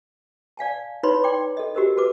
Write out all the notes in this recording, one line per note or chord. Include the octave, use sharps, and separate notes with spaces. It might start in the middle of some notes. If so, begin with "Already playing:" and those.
D5 F5 G#5 A5
D#4 E4 B4 C#5 B5 C6
D5 G5 C6 D6
A4 D#5
F#4 G4 A4 A#4 C5 D#5
F#4 A4 B4 D6